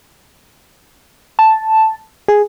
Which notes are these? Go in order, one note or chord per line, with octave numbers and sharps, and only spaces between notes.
A5
G#4